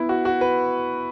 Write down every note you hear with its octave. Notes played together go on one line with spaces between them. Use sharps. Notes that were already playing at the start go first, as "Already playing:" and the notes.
Already playing: B3 E4
F#4
F#4
B4